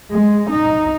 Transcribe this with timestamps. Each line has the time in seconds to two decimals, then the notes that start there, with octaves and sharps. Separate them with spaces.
0.11 G#3
0.50 D#4